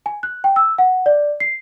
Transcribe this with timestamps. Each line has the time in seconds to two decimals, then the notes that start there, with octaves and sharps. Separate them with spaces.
0.06 G#5
0.23 F#6
0.44 G5
0.56 E6
0.78 F#5
1.06 D5
1.40 C7